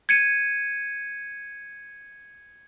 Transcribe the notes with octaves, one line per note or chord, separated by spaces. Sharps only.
G#6 C#7 D#7